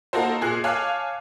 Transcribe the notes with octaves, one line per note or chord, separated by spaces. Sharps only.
A#3 D#4 F#4 A4 A#4 C5
A#2 G#4 F#6 C7
C#5 F5 G#5 A5 D6 F#6